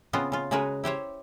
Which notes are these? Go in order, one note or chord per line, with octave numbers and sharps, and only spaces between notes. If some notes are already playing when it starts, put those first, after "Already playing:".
C#3 B3 C4 F4 D#5
C#3 F4
C#3 G#3 F#4 G#4 A#4 B4
E4 G4 C5 C#5